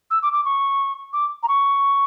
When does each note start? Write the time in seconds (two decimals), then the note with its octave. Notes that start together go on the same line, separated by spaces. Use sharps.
0.11 E6
0.22 D6
0.33 D6
0.45 C#6
1.13 D6
1.43 A#5
1.48 C#6